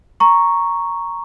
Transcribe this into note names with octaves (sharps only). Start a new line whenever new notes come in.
A#5 C#6